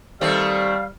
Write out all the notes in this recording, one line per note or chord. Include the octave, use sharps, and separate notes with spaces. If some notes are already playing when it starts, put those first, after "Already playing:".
D#3 G3 A3 C4 F5